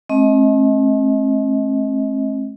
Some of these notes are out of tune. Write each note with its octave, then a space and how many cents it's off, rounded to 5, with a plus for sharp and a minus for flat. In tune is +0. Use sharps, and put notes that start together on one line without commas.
A3 -40 C4 +45 D#5 +30